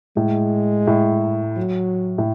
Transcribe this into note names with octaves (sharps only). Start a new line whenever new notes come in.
A2 G#3
A2
F#3
A2